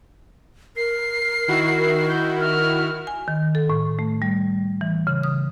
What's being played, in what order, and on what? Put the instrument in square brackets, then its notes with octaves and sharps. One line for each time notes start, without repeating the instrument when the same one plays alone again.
[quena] A#4 [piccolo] C7
[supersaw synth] D#3 E4 F#4
[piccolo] G6
F6
[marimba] G#5
D#3
A4
A2
A3
G3
E3
C#3
D#6